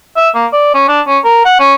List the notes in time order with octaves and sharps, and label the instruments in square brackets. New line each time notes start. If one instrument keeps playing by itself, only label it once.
[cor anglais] E5
A#3
D5
C#4
D4
C#4
A#4
F#5
C#4